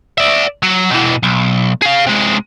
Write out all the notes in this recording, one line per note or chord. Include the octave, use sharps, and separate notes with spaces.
D5 E5
F#3
B2 E3
B1
G#4 F5
C3 G#3